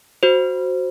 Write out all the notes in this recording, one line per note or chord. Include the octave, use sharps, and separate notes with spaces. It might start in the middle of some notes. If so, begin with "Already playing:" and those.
F#4 C5